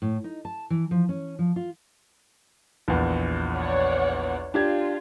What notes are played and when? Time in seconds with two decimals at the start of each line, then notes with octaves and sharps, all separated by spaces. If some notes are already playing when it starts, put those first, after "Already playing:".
0.02 A2
0.24 D#4
0.45 A5
0.70 E3
0.91 F3
1.09 C#4
1.39 F3
1.56 F4
2.88 A#1 E2
3.56 C#5 D5 F#5
4.54 D4 F4 G4 G#6